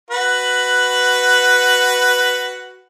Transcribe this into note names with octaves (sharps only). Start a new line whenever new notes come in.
F#4 B4